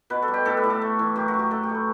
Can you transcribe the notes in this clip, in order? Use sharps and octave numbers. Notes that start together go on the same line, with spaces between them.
B2 B4
A4
G3
G4
A2 A4
B4
A2
A4
A3
E3
F#2 G4
F#4
F#2
G4
A3 A4
G4
A3
B4